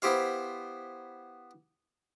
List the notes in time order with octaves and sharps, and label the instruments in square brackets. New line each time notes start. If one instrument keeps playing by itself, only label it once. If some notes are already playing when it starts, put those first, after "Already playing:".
[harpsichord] B3 E4 G4 C5 F5